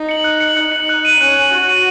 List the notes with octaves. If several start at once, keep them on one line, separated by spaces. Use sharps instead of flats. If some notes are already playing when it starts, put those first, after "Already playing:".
Already playing: D#4
C#7 F#7
F#6
C#7 F#7
D#4 F#6
C#7 F#7
F#6
D#7 F#7
C#4 F#6
D#7 F#7
F#4 F#6
D#7 F#7